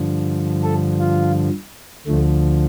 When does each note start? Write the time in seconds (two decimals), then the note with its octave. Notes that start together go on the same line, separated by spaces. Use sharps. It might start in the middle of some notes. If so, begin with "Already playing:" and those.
Already playing: G2 D3 F3
0.63 A4
1.00 F4
2.07 D2 D3 F3 A3